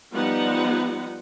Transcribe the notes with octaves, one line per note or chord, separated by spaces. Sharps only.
F3 G3 B3 D#4 F#5